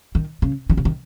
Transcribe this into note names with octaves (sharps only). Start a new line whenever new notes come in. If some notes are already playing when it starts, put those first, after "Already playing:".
D#3
C#3
D#3
C#3
D#3